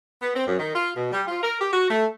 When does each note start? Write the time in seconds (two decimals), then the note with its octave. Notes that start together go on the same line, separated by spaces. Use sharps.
0.22 B3
0.34 C4
0.46 F#2
0.59 D#3
0.75 F4
0.96 B2
1.12 G3
1.28 F4
1.43 A#4
1.61 G4
1.73 F#4
1.89 A3